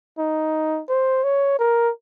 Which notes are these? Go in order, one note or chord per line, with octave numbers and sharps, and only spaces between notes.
D#4
C5
C#5
A#4